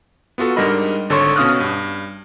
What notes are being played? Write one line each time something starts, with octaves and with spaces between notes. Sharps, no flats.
B3 F4 F#4 A4
G#2 G3 D4 A#4 D#5 B5
G#1 D3 A4 C#5 C6 C#6
B2 C#4 F5 D#6 F6 F#6
G2